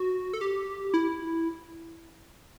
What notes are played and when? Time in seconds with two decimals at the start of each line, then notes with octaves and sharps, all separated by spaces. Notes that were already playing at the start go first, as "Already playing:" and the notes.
Already playing: F#4
0.33 A4
0.41 G4
0.94 E4